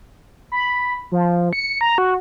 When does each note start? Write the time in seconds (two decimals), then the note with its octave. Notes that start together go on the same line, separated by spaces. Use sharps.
0.52 B5
1.12 F3
1.53 C#7
1.81 A#5
1.98 F#4